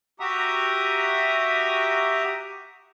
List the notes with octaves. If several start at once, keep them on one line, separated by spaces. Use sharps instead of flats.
F#4 G4 E5 A#5 D#6